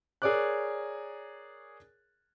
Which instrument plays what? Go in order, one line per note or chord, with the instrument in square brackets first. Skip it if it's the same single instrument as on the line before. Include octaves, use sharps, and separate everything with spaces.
[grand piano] G#4 A#4 C#5 D5 D6 F#6